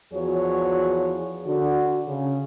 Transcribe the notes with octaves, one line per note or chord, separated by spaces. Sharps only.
E2 F3 F#4 G#4 C#5
D3 F#4
C#3